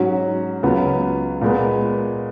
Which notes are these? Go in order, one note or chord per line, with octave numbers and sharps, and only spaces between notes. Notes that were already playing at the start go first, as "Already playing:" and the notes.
Already playing: G#2 F#3 C#4 F#4
C#2 C#3 F#3 B3 F4
A#2 G#3 B3